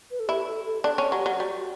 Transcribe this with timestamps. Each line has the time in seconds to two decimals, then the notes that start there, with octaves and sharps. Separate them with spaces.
0.11 B4
0.20 A4
0.28 E4 G4
0.47 A4
0.65 A4
0.84 D4 A4
0.98 C#4
1.12 F#3 G4
1.26 F#3
1.40 G3 F#4